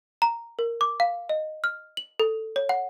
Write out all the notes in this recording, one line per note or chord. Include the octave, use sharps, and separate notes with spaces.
A#5
A#4
D6
F5
D#5
F6
F#7
A4
C#5
F#5